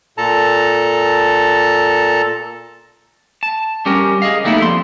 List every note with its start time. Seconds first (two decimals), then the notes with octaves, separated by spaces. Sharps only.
0.18 A#2 A4 A5 A#5
3.43 A5
3.86 G3 C#4 G4 A#4
4.22 G#4 D#5 F5
4.44 D3 G3 A3 A#3 D#4 E4
4.60 F2 C6